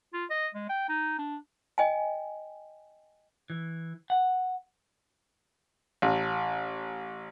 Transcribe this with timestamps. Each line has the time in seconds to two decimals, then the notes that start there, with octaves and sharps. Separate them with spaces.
0.13 F4
0.30 D#5
0.54 G#3
0.69 G5
0.89 D#4
1.19 D4
1.78 D#5 G5 G#5
3.50 E3
4.10 F#5
6.02 A1